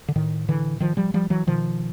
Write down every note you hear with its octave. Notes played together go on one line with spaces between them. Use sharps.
D3
A2 D#3
D3 E3
D#3 F3
F3 G3
F3 G3
E3 F#3
B2 D#3 F3